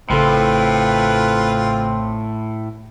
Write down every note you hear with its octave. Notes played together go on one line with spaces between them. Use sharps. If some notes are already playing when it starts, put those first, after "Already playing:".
A1 A2 C#3 C4 F4 A4 B4